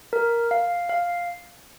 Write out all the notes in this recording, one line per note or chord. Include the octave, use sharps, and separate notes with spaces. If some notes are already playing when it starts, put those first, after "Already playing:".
A#4
F5
F5